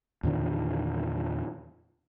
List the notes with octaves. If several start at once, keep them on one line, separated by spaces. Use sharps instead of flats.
E2 A#2 D3 D#3